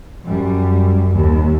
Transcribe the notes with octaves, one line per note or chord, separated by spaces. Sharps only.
F#2 G3
D#2